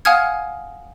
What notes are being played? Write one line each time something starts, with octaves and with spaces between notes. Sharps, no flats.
F5 F#5 G#5 D#6 F6 G#6